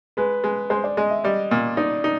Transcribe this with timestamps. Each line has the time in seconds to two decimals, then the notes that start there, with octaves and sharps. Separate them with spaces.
0.17 G#3 B4
0.44 G#3
0.70 G#3 C5
0.84 D5
0.97 G#3 D#5
1.10 E5
1.24 G3 D#5
1.51 A#2
1.77 D#4 D5
2.04 D#4